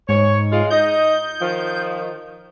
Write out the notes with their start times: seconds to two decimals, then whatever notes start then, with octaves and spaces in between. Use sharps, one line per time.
0.09 G#2 C#5
0.51 G#3 F4
0.70 D#4 D#5 G6
1.41 D#3 F3